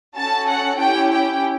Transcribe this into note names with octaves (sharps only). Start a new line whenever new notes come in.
C#4 F#4 A4 A5
F#5
C#4 E4 G4 G5
G5